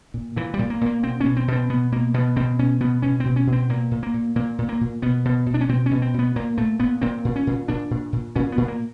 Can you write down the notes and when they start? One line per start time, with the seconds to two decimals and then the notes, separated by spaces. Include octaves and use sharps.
0.14 A#2
0.36 A#2 E3
0.54 G3
0.59 A#2
0.70 A#3
0.81 A#2 A#3
1.03 B2 C4
1.20 B2 C#4
1.36 C4
1.48 B2 C4
1.69 B2 B3
1.92 B2 A#3
2.14 B2 B3
2.36 B2 C4
2.59 B2 C#4
2.80 B2 B3
3.02 B2 C#4
3.20 B2 C4
3.36 C#4
3.47 B2
3.53 C4
3.69 A#2 A#3
3.91 A#2
4.03 A#3
4.14 A#2
4.36 A#2 A#3
4.58 A#2
4.69 A#3
4.81 A#2
5.02 B2 B3
5.25 B2
5.46 B2
5.54 D4
5.61 C#4
5.69 B2 C4
5.86 C#4
5.91 B2
6.02 C4
6.14 B2 B3
6.36 A#2 A#3
6.58 A#2 A3
6.80 A#2 B3
7.02 A#2 C4
7.25 A#2
7.36 C#4
7.47 A#2
7.68 A#2 D4
7.91 A#2
8.12 A#2
8.36 A#2 C#4
8.52 B3
8.57 A#2
8.68 A#3